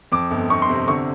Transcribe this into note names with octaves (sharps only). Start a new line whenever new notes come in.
F2 D6
G1
G1 C#6
C6
C3
D3 C#6